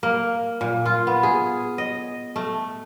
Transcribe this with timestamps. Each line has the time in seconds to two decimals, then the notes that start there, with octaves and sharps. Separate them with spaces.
0.03 A#3
0.61 A#2
0.86 F4
1.07 B3
1.23 G#4
1.78 D#5
2.36 A3